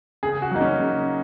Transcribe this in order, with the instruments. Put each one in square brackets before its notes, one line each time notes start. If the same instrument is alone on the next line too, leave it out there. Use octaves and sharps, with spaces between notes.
[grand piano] C#3 G#4
F#4
F#3 A#3 D#4
C#4
C#3